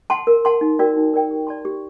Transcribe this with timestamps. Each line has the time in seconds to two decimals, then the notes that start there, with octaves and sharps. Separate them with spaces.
0.10 F#5 A5 C6
0.27 A#4
0.45 F#5 A5 C6
0.61 D#4
0.79 F#4 A#4 D5 G5
0.97 D#4
1.13 F#4 A#4 D5 G5
1.31 G4
1.47 D5 A5 C6
1.65 G4